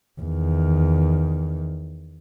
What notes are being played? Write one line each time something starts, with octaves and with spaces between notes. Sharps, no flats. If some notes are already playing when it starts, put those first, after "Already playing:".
E2 D#3